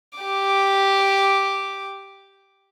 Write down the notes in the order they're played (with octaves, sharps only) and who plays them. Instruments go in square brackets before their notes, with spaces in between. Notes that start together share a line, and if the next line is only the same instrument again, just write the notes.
[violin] G4 D6